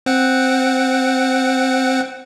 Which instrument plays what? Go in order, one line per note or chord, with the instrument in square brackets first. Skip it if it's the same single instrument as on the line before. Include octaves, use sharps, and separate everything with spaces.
[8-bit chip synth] C4 F#5